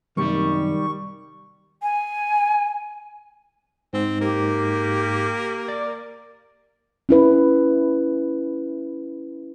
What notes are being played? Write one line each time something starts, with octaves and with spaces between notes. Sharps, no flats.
F#2 C3 D#3 G3 A#3 C#6
G#5
G#2 C4
A#3 G4
D5
C#4 E4 B4